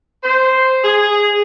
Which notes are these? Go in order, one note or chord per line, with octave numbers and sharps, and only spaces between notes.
C5
G#4